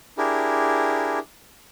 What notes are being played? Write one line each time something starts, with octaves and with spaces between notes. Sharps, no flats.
D4 E4 G4 G#4 A#4